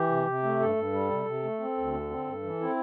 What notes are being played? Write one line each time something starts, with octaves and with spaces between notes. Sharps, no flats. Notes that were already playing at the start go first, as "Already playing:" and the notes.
Already playing: E3 G4
C3
C3
A3
G2 A4
G2
G3
C3
C3
A3
C4
D2
D3
C4
G2
E3
C4 E4